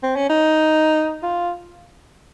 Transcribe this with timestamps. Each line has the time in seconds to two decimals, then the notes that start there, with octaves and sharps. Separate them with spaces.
0.03 C4
0.16 C#4
0.29 D#4
1.23 F4